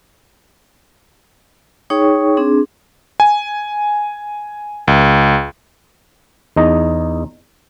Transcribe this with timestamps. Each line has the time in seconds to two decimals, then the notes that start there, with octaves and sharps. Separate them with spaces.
1.90 D#4 G#4 C#5 G5 C#6
2.37 C4 D4 G#4
3.20 G#5
4.88 C#2
6.56 E2 D#4 A#5